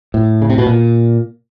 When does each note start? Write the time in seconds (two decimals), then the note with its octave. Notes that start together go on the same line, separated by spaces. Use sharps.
0.14 A2
0.42 C#3
0.50 C3
0.58 B2
0.66 A#2